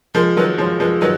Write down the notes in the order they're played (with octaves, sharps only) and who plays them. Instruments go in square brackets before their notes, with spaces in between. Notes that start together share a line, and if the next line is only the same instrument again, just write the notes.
[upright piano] F3 G#3 [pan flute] A#4
[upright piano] D#3 F#3 [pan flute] B4
[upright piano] F3 G#3 [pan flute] C#5
[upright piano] F3 G#3 [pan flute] B4
[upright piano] D#3 F#3 [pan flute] B4